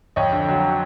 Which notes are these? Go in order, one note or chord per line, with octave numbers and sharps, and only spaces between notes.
F2 C#5 D#5
D3
F#3